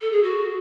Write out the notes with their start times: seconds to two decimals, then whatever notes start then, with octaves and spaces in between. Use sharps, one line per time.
0.01 A4
0.12 G#4
0.23 F#4